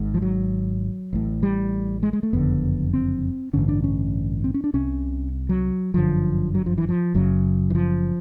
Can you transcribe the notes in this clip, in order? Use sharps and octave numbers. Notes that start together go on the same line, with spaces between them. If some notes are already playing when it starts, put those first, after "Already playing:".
Already playing: G#1 G#2
F3
F#3
A1 A2
G3
G#3
G#3
A3
F#1 F2 D3 B3
C4
A1 G2 D3 C#4
D4
C#4
C4
C#4
D4
C2 C3 C#4
F#3
G1 F#2 D3 F3
F#3
F3
E3
F3
F#1 F#2 C#3 F#3
E3
F3